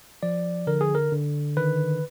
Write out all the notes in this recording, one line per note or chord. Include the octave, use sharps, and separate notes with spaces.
F3 D5
D3 A#4
G#4
A#4
D3
D#3 B4